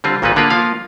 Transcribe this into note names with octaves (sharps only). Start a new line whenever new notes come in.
D3 G3 C4 F4
G#1 A#2 A#3 B3 D#4 B4
D3 A#3 B3 F4 A#4 B4
F3 A#3 F4 F5